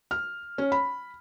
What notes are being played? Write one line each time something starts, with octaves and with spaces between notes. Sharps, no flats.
F6
C#4
B5